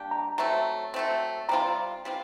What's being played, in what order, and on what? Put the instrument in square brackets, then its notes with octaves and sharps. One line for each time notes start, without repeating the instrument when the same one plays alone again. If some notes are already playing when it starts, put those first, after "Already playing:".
Already playing: [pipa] G3 A#3 D4 G4
[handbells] A#5
[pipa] F#3 A3 C4 [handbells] A#5
[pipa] F#3 A3 C4
[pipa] G3 C4 F4 [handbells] A#5
[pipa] G3 C4 F4